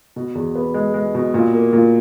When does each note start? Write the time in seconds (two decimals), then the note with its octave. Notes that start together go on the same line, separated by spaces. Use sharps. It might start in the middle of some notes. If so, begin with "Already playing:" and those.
0.16 B2
0.35 E2
0.55 B3
0.74 G#3
0.94 G#3
1.14 B2
1.34 A#2
1.54 A#3
1.73 A#2